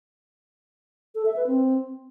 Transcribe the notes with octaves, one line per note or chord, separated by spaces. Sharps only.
A4
E5
B4
C4